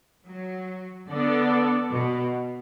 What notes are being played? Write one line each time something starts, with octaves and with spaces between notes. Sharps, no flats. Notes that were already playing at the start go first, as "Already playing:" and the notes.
F#3
D3 B3 D4 A4 D5
B2